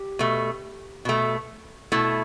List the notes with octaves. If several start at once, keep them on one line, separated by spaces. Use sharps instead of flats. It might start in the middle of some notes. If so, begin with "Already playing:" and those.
Already playing: G4
B2 A3
B2 A3
B2 A3 E4